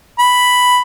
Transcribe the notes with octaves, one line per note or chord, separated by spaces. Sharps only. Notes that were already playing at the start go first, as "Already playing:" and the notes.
B5